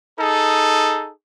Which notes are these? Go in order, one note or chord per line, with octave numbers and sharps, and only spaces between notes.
D#4 G#4 A4